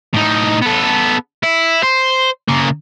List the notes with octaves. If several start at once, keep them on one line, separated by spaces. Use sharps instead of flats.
A2 D#4
B3 A4
E4
C5
C#3 A#3